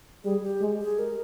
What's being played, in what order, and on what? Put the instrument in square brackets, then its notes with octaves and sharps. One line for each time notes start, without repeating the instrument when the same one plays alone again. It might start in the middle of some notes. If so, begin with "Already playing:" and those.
[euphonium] G3 [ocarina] G#4
[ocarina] G4
[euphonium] G#3
[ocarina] G#4
A#4